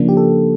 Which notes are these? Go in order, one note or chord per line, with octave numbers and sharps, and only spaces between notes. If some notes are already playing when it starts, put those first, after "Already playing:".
Already playing: C#3 F3 A#3 D4
G4
A4